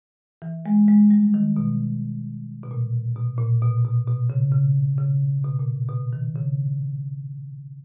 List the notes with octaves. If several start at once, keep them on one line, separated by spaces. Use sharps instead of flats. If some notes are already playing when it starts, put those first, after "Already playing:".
E3
G#3
G#3
G3
D#3
B2
B2
A#2
B2
A#2
B2
B2
B2
C#3
C#3
C#3
B2
A#2
B2
D#3
C#3